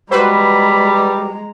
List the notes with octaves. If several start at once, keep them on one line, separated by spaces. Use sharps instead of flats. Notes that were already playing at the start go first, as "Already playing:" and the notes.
G3 G#3 F#4 B4 C5 A#5 B5